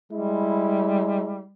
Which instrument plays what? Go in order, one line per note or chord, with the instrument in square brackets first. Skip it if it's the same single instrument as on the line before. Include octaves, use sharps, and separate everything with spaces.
[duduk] G3 [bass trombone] G#3 [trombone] E4